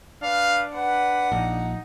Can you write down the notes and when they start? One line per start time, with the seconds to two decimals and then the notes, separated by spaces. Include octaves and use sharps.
0.22 D4 B4 F5
0.74 B4 F#5
1.32 A#1 D#4